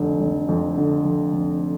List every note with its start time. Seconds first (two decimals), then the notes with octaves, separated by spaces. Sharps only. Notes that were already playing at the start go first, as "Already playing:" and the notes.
Already playing: F1 D3
0.20 F1
0.49 F2
0.77 D3
1.05 F1
1.33 F1